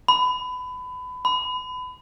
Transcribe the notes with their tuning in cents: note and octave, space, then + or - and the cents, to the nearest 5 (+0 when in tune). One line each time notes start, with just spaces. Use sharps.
B5 +25
B5 +30